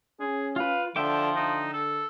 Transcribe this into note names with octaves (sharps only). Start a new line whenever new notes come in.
C#4 G#4
F4 B4 F5
D3 F3 E5 G5 D6
D3 D#4
A4